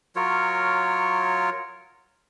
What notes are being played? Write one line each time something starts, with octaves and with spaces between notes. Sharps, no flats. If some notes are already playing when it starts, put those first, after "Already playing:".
F#3 F4 A#4 C#5